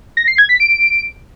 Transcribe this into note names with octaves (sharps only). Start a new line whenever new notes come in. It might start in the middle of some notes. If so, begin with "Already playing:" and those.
A#6
C7
G#6
B6
D7